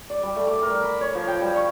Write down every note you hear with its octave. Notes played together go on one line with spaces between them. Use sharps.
D5
G3
A3
D6
A#4
B5
C#5
F3
G5
G3
C#6